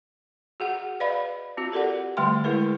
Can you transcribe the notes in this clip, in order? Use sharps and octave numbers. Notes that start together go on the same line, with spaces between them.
F#4 G#4 F#5
B4 D5 D#5 F5 B5
C4 F4 F#4
G4 A4 A#4 D5 F#5
D3 G3 A3 G5 C6
G#3 E4 G#4 A#4 B4